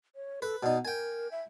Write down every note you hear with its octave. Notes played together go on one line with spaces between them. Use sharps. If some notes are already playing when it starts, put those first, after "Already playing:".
C#5
A4 B4
B2 D#4 D5
A#4 G5 G#5
E5